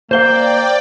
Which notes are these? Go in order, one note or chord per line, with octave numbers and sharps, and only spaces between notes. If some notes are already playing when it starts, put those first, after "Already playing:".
A#3 C5 D5 F5 G5 G6 G7